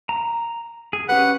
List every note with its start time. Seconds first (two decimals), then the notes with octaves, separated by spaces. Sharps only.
0.09 A#5
0.93 G#4
1.09 C#4 G4 B4 F#5